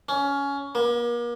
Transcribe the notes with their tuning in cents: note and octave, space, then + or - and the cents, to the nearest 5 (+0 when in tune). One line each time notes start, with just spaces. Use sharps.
C#4 +15
A#3 +40